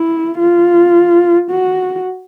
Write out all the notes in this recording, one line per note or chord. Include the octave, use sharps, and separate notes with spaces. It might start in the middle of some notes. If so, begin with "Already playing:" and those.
Already playing: E4
F4
F#4